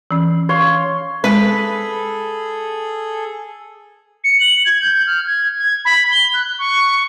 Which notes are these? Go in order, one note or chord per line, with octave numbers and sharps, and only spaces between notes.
E3 C#4
C#5 F5 C6
G#3 G#4 A4 B4
C#7
F#7
G#6
G6
F6
G#6
G#6
B5
G7
F#6
C#6